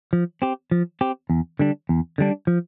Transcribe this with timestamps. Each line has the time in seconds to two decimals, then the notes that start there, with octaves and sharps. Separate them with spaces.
0.13 F3
0.42 C4 G4
0.71 F3
1.01 C4 G4
1.30 E2
1.59 D3 G3 D4
1.89 E2
2.18 D3 G3 D4
2.47 F3